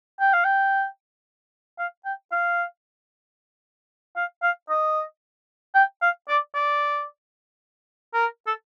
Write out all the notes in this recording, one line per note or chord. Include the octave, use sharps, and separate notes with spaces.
G5
F5
G5
F5
G5
F5
F5
F5
D#5
G5
F5
D5
D5
A#4
A4